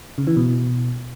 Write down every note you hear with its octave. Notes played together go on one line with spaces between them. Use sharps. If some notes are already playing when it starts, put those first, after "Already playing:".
C#3
E3
B2